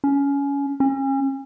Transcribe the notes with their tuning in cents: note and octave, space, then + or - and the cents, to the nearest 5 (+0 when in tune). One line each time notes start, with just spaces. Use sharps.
C#4 +20
C#4 -35